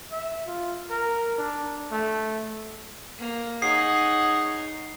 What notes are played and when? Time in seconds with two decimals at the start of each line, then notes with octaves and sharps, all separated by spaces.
0.12 E5
0.47 F4
0.90 A#4
1.38 D4
1.91 A3
3.19 A#3
3.62 D#4 G#4 C#5 F#5 C7